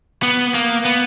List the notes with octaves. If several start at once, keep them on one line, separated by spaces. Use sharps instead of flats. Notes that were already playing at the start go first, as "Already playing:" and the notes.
B3
A#3
B3